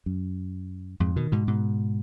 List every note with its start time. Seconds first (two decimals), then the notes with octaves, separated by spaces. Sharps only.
0.06 F#2
1.00 F2 G#2
1.16 B2 D#3
1.32 G#2 B2
1.47 G#2 B2